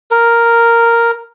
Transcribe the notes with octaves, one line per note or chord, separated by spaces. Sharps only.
A#4